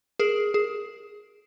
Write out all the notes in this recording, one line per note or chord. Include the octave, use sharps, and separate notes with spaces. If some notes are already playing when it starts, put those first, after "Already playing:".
G#4 A#4
G#4